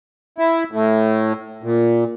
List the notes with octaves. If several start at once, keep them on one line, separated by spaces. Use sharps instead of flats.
E4
A2
A#2